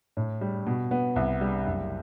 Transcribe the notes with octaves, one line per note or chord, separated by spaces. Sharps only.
A2
G3
B2
B3
C2
G3
F#1